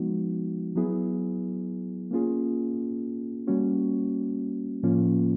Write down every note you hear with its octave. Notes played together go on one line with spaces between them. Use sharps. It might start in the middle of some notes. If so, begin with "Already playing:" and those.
Already playing: F3 G#3 B3 D#4 F#4
F#3 B3 E4 G#4
A#3 C#4 F4 G#4
G3 A#3 C#4 F#4
A2 F3 A#3 C#4 F4